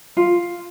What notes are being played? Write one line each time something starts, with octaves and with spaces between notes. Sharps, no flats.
F4